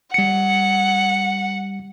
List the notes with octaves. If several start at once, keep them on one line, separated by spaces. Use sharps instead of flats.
G3 F#5 C#7